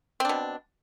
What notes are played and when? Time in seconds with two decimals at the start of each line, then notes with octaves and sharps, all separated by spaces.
0.20 C4
0.25 D4
0.29 B2